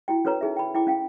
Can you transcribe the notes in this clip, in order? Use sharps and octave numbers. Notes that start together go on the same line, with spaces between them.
E4 F#4 G5
C#4 F#4 A4 B4 C#5 A#5
D#4 G#4 E5
G5 B5
E4 G5 D6
C#4 F5 G5